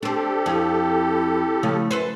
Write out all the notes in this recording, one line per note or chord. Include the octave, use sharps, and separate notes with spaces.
C4 D4 G4 A4
F2 E4
C#3 F3 A3
F#2 A4 B4 C5